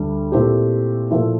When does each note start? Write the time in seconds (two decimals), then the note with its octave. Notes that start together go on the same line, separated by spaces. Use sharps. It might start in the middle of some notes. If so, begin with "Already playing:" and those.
Already playing: D2 D3 G3
0.32 A#2 A3 C4 E4 G4
1.11 A#2 F3 A3 E4